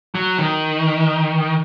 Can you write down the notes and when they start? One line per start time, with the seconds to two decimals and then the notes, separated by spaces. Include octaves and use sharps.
0.15 F#3
0.39 D#3